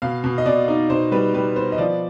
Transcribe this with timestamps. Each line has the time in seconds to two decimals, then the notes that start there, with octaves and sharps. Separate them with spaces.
0.02 B2 F5
0.24 B2
0.38 D#5
0.46 B2 D5
0.68 D#4
0.90 B2 C5
1.12 G3 B4
1.34 G3 B4
1.56 B3 C5
1.72 D#5
1.78 F3 D5